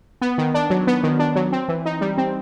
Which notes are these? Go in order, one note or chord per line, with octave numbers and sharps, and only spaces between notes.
B3
D#3
D4
F#3
B3
D#3
D4
F#3
C4
E3
D#4
G3
C4